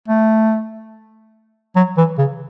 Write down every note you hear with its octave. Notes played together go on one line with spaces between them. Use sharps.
A3
F#3
E3
C#3